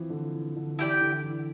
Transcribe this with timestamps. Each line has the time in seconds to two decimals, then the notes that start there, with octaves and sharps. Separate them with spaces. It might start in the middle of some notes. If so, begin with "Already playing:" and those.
Already playing: E3 F3 C4
0.10 D3
0.33 E3
0.56 D3
0.79 E3 E4 G4 D5 G5
1.01 D3
1.24 E3